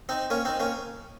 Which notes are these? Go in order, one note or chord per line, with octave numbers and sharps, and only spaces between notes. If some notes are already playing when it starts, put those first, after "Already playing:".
C4 D#4
A#3 C#4
C4 D#4
A#3 C#4